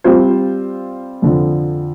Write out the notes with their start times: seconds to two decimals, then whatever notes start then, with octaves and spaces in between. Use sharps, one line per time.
0.04 G3 C4 F4 C5
1.22 F2 D3 F3